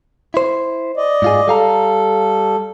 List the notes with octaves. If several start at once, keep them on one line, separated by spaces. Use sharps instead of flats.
E4 C5
D5 D#5
G#2 F4 G#4
G3 A4 F5 A#5